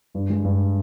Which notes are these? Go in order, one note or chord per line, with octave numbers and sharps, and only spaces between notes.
G2
G#3
G2